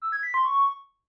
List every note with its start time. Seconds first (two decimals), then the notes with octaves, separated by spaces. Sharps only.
0.02 E6
0.12 G#6
0.23 B6
0.34 C6
0.45 C#6